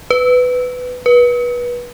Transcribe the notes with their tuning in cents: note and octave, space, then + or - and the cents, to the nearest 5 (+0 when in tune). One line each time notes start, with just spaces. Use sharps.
B4 +15
B4 -25